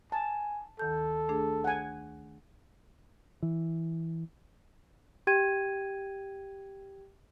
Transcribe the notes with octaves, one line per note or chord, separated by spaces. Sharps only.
G#5 A5
D2 D#3 A4 G6
A3 D4 G#4
F#5 G#5
E3
G4 G5 G#6 D#7